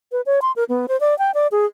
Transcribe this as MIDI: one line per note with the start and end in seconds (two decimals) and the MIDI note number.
0.12 0.21 71
0.26 0.40 73
0.42 0.52 84
0.56 0.64 70
0.69 0.86 59
0.88 0.99 72
1.00 1.17 74
1.19 1.31 79
1.34 1.47 74
1.52 1.66 68